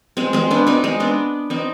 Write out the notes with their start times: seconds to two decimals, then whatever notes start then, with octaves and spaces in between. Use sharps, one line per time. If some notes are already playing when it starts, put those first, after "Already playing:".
0.17 G#3 C4
0.33 G#3 C4
0.51 B3 D4
0.67 C4 D#4
0.84 G#3 C4
1.00 B3 D4
1.50 C4 D#4